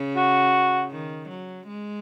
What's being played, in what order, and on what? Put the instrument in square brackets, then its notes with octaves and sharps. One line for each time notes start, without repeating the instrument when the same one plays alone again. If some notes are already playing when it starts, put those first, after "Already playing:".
Already playing: [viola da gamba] C#3
[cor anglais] F#4
[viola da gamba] D#3
F#3
G#3